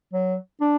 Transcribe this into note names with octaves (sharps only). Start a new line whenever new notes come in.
F#3
D4